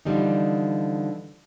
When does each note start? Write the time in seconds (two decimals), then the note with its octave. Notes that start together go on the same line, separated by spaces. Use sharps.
0.05 D3 E3 F3 G3 A3 D#4